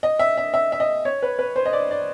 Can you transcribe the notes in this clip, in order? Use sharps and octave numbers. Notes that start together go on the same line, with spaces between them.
D#5
E5
E5
E5
E5
D#5
C#5
B4
B4
C5
D#5
D5
D5